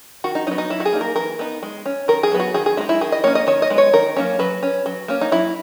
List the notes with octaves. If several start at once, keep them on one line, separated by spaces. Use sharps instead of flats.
D#3 F#4
D#4
F#3 B3 D#4
D#4
F#3 E4
F#4
G#4
A#3 D#4
A#4
E3 A#4
B3 D#4
G#3
C#4
D#3 A#4
G#4
F#3 B3
F#4
D#3 G#4
G#4
G#3 D#4 E4
E4
D#3 G#4
D#5
A#3 C#4 C#5
D#5
D#3 C#5
D#5
G#3 B3
C#5
D#3 A#4
F#3 A#3 C#4
F#3 B4
C#4
F#3
A#3 C#4
D#4
F#3 E4